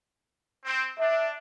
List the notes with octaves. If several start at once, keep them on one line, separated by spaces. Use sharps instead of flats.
C4
D4 E5